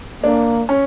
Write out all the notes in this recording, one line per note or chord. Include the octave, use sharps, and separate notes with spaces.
A#3 D4
C#4